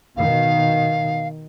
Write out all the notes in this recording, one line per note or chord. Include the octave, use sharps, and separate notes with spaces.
B2 D#3 F5